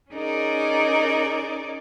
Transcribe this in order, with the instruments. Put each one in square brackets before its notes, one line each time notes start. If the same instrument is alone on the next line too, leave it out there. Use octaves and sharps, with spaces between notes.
[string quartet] C#4 D#4 G#4 A#4 D5